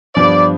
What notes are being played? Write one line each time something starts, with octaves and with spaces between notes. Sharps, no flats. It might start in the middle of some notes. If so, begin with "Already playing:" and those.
G2 F3 B3 D4 D5